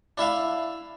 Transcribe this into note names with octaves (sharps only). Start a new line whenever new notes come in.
D4 E4 E5 F5